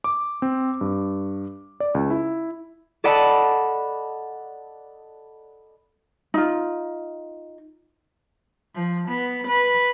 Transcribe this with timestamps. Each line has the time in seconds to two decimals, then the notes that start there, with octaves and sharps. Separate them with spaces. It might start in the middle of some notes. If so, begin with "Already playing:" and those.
0.04 D6
0.42 C4
0.81 G2
1.80 D5
1.94 C#2
2.10 E4
3.04 A4 D5 D#5 F#5 A5 B5
6.34 D#4 F4
8.75 F3
9.08 B3
9.47 B4